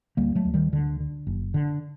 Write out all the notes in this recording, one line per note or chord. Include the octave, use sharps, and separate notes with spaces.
D2 G3 A#3
F#3 A3
D2
D#3 G3
D2 D3
D3
F#1
D3